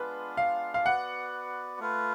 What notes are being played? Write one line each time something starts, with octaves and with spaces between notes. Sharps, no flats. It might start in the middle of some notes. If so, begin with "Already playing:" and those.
Already playing: G#3 B3 D4 F4 B4
F5
F5
B3 F#4 B4 D5 F#5
A3 F4 B4